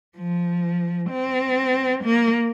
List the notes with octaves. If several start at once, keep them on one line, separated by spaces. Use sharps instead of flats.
F3
C4
A#3